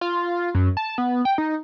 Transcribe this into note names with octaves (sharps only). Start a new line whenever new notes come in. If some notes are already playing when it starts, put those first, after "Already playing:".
F4
F#2
A5
B3
G5
D#4